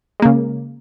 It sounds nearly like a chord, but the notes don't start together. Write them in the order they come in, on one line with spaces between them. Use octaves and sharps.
G#3 A#3 C#3